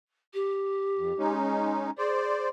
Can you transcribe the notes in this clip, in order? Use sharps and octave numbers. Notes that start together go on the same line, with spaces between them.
G4
F2
G#3 C#4 D#4
G#4 C5 D5